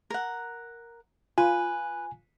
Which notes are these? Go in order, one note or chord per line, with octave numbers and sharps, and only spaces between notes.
A#4 F#5
F4 B4 G#5